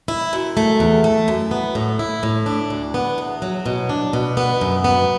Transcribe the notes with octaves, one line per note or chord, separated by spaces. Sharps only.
E4
F#2
A3
E2
A3
F#2
B3
A2
E4
A2
D4
D2
B3
E2
F#3
B2
D4
B2
B3
F#2
B3